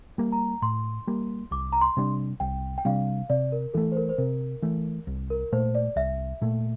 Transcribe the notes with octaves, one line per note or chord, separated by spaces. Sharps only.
G3 A#3
A#5
A2 C6
G3 A#3
C2 D6
A#5
C6
C3 G3 D4
C2 G5
G5
C3 G3 D4 F5
C3 D5
A#4
E3 A3 A4
C5
A#4
C5
C3 A#4
E3 A3
C2
A#4
A#2 A3 C5
D5
C2 E5
A#2 A3